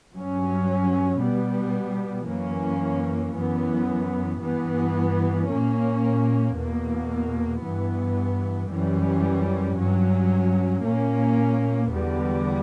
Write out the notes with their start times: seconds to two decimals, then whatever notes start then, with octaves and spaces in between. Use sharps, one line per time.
0.13 G2 F#3 C#4
1.20 B2 G3 B3
2.28 F#2 E3 A#3 C#4
3.34 F#2 E3 B3
4.41 G2 E3 B3
5.49 A#2 A#3 C#4
6.55 E2 B2 A#3
7.63 G2 E3 B3
8.70 F#2 E3 G3 C#4
9.77 G2 F#3 C#4
10.84 A#2 A#3 C#4
11.92 E2 D3 G3 B3